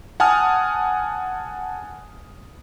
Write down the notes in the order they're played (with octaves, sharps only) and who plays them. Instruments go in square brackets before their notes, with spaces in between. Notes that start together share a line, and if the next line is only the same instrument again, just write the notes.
[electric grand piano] F#5 G#5 A5 D#6 F6